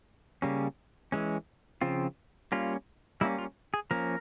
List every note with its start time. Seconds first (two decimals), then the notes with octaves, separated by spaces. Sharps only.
0.42 C#3 G3 A#3 C#4
1.12 E3 G#3 C#4
1.81 C#3 F3 C4 F4
2.52 G3 A#3 C#4 F4
3.21 G3 A#3 C#4 E4
3.38 F4
3.74 G#4
3.91 F3 A#3 C#4 A#4